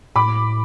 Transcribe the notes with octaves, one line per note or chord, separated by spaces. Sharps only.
A2 B5 D6